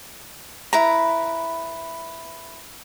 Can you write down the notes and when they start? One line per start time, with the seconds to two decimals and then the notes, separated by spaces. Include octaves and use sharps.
0.73 E4 B4 A#5